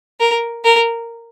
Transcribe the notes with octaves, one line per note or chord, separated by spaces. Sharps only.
A#4
A#4